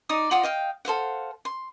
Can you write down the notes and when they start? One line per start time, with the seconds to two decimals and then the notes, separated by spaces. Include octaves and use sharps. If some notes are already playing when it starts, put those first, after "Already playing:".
0.09 D#4 D5 D#6
0.31 F4 D5 F#5 D#6
0.43 D#5 F5 G5
0.85 A4 C5 F5 F#5
1.45 C6